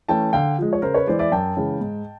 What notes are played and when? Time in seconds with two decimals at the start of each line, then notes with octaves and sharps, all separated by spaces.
0.09 E3 A3 C#4 G5 A5
0.33 D3 F5 G5
0.58 F3 G#3
0.73 C#5
0.82 C#3 A#4 C5
0.94 B4 C#5
1.07 E3 G#3 C5 D5
1.19 D5 E5
1.32 F#2 G5 A5
1.57 C#3 E3 G#3
1.81 G#2